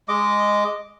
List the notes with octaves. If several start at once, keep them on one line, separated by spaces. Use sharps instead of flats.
G#3 D#5 D6